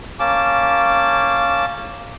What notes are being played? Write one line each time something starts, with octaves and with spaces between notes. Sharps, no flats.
A#3 C#4 A5 D6